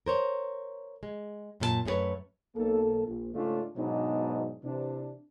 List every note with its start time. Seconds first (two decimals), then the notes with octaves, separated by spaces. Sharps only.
0.06 A#4 C5 C#5
1.03 G#3
1.60 F#2 A#2 A4 A5
1.85 F#2 A3 G#4 B4 C#5
2.55 B1 A#3 A4
3.05 A#1
3.33 G#2 C#3 A3 C#4 D4 F4
3.76 G#2 B2 F#3 B3 D4 D#4
4.63 C3 E3 D4